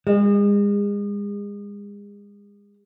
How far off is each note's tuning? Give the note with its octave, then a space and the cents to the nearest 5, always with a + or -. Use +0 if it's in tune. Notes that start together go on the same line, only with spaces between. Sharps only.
G#3 -35